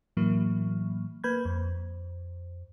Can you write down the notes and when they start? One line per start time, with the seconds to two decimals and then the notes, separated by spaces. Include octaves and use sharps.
0.17 A2 E3 F#3 A#3
1.24 A#3 B4 B5 G6 G#6
1.45 F2